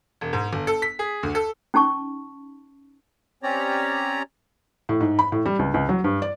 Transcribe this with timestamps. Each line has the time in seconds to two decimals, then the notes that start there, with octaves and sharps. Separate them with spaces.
0.21 E1
0.33 G#2
0.53 G1
0.67 A4
0.82 B6
0.99 G#4
1.23 D2
1.35 A4
1.74 C#4 D#4 A5 C#6
3.43 C4 C#4 G4 C#5 D5 A#5
4.89 A2
5.01 G#2
5.19 B5
5.32 A2
5.46 G3
5.59 C#2
5.74 C#2
5.89 F#3
6.04 G2
6.22 D5